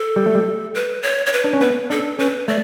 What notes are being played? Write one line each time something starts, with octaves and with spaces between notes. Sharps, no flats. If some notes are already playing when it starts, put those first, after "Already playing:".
Already playing: A4
G3
A3
G3
B4
C#5
C#5
B4
D4
C#4
B3 B4
D4 A4
C#4 B4
A3 D5